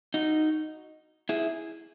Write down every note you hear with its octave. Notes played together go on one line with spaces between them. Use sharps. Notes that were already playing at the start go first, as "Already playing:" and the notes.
D#4 F#4
E4 G#4